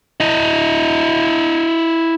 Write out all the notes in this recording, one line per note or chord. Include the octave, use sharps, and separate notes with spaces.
E4 D#5